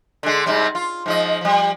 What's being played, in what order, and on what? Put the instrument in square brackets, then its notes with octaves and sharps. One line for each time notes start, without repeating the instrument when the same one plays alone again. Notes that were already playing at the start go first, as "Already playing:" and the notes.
[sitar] D3 G#3
G#2 C3 G3
F4
G#2 F3 D#5
F3 G3